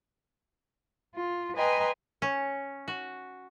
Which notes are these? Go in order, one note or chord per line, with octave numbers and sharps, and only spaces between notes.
F4
B4 D#5 G5 G#5 A#5 C6
C#4
F#4